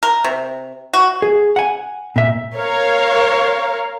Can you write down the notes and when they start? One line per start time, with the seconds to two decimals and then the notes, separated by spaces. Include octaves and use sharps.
0.03 A#4
0.24 C3
0.93 F#4
1.22 G#4
1.56 F#5 G#5
2.16 A#2 E5
2.55 A#4 C#5 F5